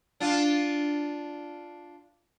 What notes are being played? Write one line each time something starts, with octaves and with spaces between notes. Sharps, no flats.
D4 F4